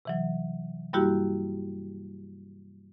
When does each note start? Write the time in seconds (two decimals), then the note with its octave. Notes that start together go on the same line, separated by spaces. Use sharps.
0.05 C3 E3 F#3
0.93 G2 G3 A#3 E4 F#4 G4